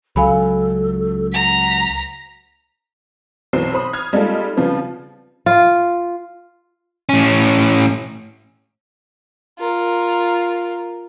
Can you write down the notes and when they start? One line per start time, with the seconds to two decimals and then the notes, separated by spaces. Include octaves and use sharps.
0.16 C#2 F#3 A4 F5 G#5 B5
1.33 F#5 A#5 B6
3.53 B1 E3 F#3 C4 C7
3.74 C5 B5 D#6
3.93 D#6 F6 G#6
4.13 G3 G#3 A#3 D#4 F4 A4
4.57 C#3 F3 G3 B3
5.46 F4
7.09 A2 C#4
9.59 F4 A#4